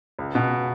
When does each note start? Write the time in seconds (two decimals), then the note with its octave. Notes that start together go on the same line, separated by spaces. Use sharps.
0.19 C#2
0.35 B2